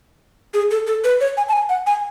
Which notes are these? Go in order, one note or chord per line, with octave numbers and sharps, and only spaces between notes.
G#4
A4
A4
B4
C#5
G#5
A5
G#5
F#5
G#5